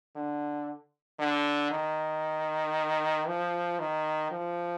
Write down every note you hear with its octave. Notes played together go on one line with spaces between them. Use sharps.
D3
D3
D#3
F3
D#3
F3